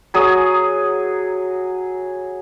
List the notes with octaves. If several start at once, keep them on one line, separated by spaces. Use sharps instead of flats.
F#3 G#4 D#6